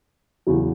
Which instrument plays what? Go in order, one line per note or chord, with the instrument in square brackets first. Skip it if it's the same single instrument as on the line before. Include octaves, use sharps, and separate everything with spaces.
[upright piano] E2 C#3 F#3